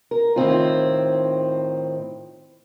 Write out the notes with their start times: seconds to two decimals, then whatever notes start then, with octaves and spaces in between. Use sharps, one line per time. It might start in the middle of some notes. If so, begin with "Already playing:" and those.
0.11 A#4
0.36 A2 D#3 C4 F4